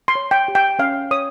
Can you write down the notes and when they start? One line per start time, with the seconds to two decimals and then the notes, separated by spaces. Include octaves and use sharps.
0.08 C6
0.15 C#5
0.31 G5
0.48 G4
0.55 G5
0.79 C#4 F5
1.11 C#5 D#6